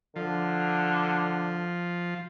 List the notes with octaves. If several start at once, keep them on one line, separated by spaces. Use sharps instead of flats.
D3 F3